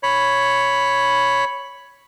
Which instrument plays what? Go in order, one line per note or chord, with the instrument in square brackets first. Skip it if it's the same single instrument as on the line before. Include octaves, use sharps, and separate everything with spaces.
[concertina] C#5 B5